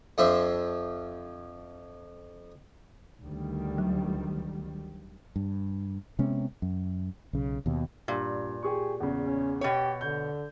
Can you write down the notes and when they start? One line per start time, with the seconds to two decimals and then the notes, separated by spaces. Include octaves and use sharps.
0.18 F2 F3 D4 E5 C6
3.22 D2 D#3 G3
3.78 F#3
5.36 G2
6.19 C3 G#3 B3 C#4
6.62 F#2
7.33 B1 C#3
7.66 D#2 B2
8.08 G2 A#2
8.63 G4 G#4 C#6
9.00 E2 C#3
9.23 C#4
9.61 B2 G4 C#5
10.01 D3 G6